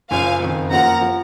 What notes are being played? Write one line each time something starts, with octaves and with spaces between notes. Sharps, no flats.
F#1 F#2 F3 F5 G#5
F#1 F2 D#3
F#2 F3 A#3 F4 F#5 A#5
F3